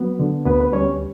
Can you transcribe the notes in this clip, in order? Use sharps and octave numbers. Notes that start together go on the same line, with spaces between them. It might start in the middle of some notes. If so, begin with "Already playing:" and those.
Already playing: F#3 B3
D3
D2 B3 B4
B4
G3 C#4 C#5